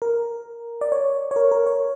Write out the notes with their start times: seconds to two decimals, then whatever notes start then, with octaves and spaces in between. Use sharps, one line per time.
0.02 A#4
0.81 D5
0.92 C#5
1.31 C#5
1.36 A#4
1.51 A#4
1.66 C#5